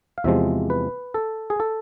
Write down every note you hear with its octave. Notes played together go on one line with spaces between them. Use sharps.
F5
E2 C3 F3 G#3 E5
B4
A4
G#4
A4